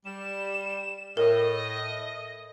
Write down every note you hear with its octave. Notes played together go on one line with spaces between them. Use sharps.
G3 E7
A2 A#4 D#5